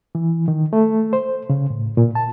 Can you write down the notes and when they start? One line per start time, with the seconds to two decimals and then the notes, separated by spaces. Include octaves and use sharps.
0.15 E3
0.48 D#3
0.73 A3
1.13 C5
1.50 C#3
1.70 A2
1.97 A#2
2.15 A5